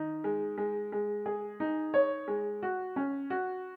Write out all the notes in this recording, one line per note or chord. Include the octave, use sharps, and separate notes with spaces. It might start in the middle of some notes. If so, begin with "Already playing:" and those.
Already playing: D#3 D#4
G#3
G#3
G#3
G#4
D#4
C#5
G#3
F#4
C#4
F#4